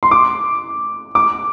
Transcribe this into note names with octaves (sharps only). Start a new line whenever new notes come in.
C6
D6
D6